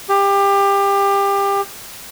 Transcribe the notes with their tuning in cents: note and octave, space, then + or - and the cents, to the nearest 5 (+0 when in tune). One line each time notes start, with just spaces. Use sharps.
G4 +25